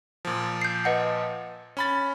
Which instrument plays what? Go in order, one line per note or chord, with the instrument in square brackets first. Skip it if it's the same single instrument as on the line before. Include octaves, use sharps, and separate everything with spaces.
[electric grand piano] A#2 F3
[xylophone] G6 C7
B4 D#5 F#5
[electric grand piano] C#4 B5 A6